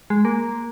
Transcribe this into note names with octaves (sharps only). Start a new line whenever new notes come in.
G#3
A#3